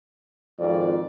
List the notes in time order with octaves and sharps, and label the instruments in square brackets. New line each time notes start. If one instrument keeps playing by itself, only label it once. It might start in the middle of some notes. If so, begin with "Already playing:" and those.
[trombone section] G#1 F2 [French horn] D5